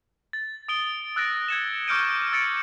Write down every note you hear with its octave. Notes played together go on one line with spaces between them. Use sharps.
A6
D#6 D7 G7
E6 F#6 A6 A#6 D7
G#6 C#7 E7
C#6 D6 F6 G6 D7 D#7
C#6 E6 A6 C#7 D7